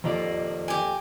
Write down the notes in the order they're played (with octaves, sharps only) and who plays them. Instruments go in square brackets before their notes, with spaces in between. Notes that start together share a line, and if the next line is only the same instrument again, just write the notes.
[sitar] F2 A#3 [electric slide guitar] D#3 F4 D5
[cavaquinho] G4 G#5